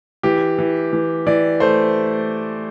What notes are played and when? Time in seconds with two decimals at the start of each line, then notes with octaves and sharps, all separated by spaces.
0.23 E3 G4
0.58 E3
0.93 E3
1.27 E3 D5
1.60 A3 C5